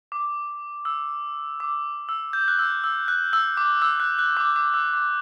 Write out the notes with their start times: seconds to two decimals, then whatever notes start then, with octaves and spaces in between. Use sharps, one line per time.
0.12 D6
0.85 E6
1.60 D6
2.09 E6
2.33 G6
2.48 F#6
2.59 E6
2.84 E6
3.08 F#6
3.33 E6
3.57 D6
3.82 E6
4.00 F#6
4.19 F#6
4.37 D6
4.56 D6
4.74 E6
4.93 D6